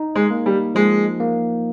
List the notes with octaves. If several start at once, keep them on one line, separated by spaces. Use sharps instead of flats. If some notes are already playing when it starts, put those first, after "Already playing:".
Already playing: D#4
G#3
A#3
G3
F3 G#3
A#3